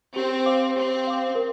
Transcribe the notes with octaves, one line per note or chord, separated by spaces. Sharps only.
C4 G4
C5 F5 D6
C4 G4
C5 F5 D6
A#4